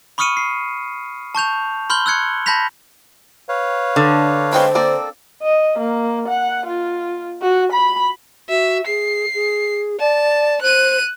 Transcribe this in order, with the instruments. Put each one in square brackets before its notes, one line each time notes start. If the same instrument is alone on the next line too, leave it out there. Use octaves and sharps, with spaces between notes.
[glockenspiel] B5 C#6 D#6 F6 C#7 D#7
C7
A5 C#6 G6 F7
B5 C6 F6 G6 F#7 G7
E6 F#6 G#6 C#7
A5 B5 G6 A#6 B6 F7
[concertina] B4 C#5 F5
[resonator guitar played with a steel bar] D3
[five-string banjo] G#3 G5 B5 [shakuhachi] C5
[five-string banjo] A#3 C4 D5 [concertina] A4
[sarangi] D#5
A#3
F#5
F4
F#4
B5
[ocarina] F#4 [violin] E5
[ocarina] G#4 [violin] C7
[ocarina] G#4
[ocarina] D5 [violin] A5
[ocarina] C5 [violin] F#6 D#7